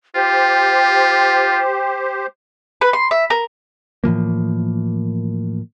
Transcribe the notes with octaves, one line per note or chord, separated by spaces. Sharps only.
F4 G4 C5 G5
B4
C6
E5
A#4
A2 E3 F3 A#3